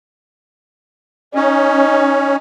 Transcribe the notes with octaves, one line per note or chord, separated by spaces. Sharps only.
C#4 D#4